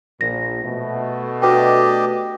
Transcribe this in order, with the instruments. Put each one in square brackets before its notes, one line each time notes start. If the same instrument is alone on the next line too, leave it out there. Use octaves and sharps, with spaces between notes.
[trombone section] A#1 A#2 [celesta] A#6
[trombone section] B2 A3
[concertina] D4 G4 D#5 [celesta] F#4 B4 G5